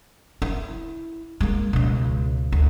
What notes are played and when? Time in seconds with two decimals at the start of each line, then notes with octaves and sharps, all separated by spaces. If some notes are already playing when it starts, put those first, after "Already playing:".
0.42 E4
1.40 G#3 A#3
1.73 C#2 B2
2.52 D2